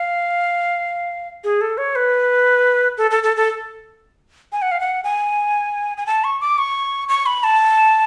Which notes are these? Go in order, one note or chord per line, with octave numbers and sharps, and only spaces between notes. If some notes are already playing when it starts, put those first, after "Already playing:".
Already playing: F5
G#4
A4
C#5
B4
A4
A4
A4
A4
G#5
F#5
F5
F#5
G#5
G#5
A5
C#6
D6
C#6
C#6
B5
A5